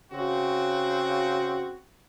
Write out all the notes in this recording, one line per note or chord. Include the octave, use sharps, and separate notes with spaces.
C#3 C4 F#4